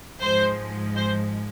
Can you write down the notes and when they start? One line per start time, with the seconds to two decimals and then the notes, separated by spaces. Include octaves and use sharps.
0.20 G#2 F3 G#3 C5
0.95 C5